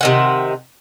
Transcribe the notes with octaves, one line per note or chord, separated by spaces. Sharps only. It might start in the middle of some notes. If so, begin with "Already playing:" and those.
C3 D#3 F#5